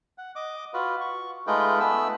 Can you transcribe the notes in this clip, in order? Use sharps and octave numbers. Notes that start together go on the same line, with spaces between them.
F#5
D#5 D6
F4 F#4 B4
C#6
G#3 A3 D#4 F4 B4 G5
A3 B3 B4 E6